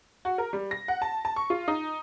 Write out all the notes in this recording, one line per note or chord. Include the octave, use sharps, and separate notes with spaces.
F#4
A#4
G3
A#6
F#5
A5
A5
C#6
F4
D#4